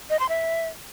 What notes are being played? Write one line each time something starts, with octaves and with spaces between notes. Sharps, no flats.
D#5
C6
E5